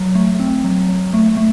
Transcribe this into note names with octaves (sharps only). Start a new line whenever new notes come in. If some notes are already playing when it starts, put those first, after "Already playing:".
Already playing: F#3
A3
C4
F#3
F#3
A3
A3